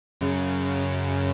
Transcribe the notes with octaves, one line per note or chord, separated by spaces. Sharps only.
F#2 C#3